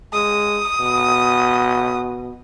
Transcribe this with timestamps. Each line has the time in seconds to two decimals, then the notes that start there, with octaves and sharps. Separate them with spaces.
0.13 G#3 D#6
0.80 B2